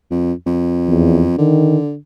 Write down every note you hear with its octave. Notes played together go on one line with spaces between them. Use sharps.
F2
F2
E2
D3 D#3